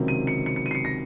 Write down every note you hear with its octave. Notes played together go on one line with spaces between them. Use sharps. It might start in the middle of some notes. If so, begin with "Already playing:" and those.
Already playing: C#2 C3 D#3 F#3
D#7
C#7
C#7
C#7
D#7
C7
C#7
A#6